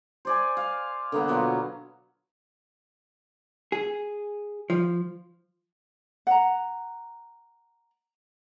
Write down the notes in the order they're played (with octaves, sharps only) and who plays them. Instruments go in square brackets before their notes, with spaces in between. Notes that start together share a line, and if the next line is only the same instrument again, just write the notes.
[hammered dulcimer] C5 D5 G#5
F5
D3 A#3 B3
B2 F#3 F4 F#4
[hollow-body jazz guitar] G#4
F3
[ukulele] F#5 A#5